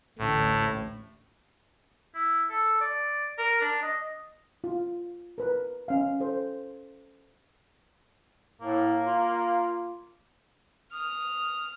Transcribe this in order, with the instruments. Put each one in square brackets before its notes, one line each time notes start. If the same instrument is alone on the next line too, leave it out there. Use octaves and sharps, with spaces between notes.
[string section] A1 D2 [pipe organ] A2
[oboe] E4
A4
D5
A#4
D4
D#5
[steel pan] F4
A#4 B4
C#4 F5
A4 C5
[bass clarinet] A2 [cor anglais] A#3
[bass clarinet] F4
[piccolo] D#6 [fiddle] F6